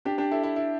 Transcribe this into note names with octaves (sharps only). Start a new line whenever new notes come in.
D4 G4
D4 G4
E4 A4
E4
E4